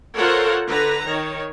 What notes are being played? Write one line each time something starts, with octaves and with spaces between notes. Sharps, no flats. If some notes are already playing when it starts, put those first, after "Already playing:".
F4 A4 A#4 C5 C#5 F#5
D3 B4 A#5
D#3 C#5